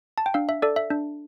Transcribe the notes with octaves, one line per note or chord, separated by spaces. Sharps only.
A5
G5
D4 F5
E5
A4 D5
E5
D4